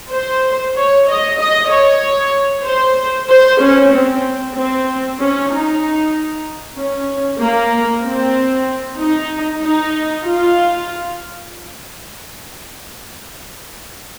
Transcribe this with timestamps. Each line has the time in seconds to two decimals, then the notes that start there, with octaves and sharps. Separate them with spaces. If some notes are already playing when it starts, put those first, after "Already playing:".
0.12 C5
0.76 C#5
1.08 D#5
1.40 D#5
1.71 C#5
2.66 C5
3.30 C5
3.61 C#4
3.92 C4
4.55 C4
5.20 C#4
5.51 D#4
6.77 C#4
7.40 A#3
8.04 C4
8.99 D#4
9.63 D#4
10.25 F4